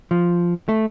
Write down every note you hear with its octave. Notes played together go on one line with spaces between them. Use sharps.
F3
A3